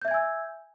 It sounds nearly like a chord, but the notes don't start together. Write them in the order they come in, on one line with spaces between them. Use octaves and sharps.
G6 E5 G#6 G#5 E6